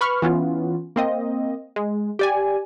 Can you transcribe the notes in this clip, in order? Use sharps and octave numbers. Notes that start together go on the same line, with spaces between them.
B4 B5 C#6 F6
E3 B3 C#4 F4
A#3 C4 D#5
G#3
G4 D5 G#5